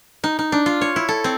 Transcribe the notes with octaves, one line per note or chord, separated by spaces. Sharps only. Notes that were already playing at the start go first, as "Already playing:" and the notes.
D#4
D#4
D4
F4
C#5
E4
A4
C4